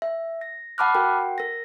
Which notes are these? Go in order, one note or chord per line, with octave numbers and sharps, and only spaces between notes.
E5
A#6
F#5 A5 B5 D6 F6 F#6
F#4 A#4 F#5 G5
A#4 A#6